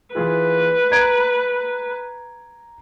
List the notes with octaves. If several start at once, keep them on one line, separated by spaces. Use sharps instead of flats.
E3 F4 G#4 B4
A#5 G#6 D7